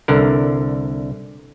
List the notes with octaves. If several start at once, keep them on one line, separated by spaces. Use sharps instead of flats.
C2 D3 A#4